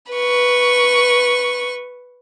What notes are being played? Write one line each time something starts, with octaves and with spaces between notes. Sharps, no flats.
B4 C#6